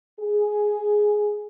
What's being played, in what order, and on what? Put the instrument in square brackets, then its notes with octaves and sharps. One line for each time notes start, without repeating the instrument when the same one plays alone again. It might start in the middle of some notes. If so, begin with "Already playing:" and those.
[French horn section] G#4